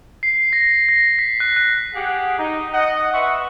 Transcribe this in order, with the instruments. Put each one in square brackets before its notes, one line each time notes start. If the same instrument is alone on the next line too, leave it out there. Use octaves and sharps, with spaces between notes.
[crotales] C7
A#6
A#6
B6
F#6
F#6
[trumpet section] G4 G#4 F#5
D#4
D#5 F#5
B4 E5 F#5 C6 C#6